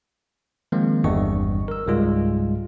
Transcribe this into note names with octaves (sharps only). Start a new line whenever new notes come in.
D#3 F3 G#3 A#3 C4
G1 E2 G2 G3 D#5 C#6
A#4 E6
C#2 G#2 G3 G#3 F4